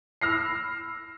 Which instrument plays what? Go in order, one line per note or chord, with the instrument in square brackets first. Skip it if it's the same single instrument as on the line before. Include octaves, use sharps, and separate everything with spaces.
[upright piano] B5 E6 F6 A#6 C7